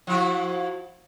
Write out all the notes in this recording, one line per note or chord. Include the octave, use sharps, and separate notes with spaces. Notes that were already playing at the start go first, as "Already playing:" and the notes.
F3 E4 F#4